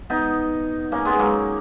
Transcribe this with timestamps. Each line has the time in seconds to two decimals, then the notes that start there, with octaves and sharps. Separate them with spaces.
0.10 B3 D#4
0.92 A#3 C#4
1.05 G#3 B3
1.19 F#3 A#3